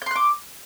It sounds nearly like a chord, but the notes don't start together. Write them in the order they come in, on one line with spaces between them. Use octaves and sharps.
G6 C6 F#6 D6